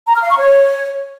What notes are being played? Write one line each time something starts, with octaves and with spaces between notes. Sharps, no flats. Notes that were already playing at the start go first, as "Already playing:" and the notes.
A#5
F6
F5
C#6
C#5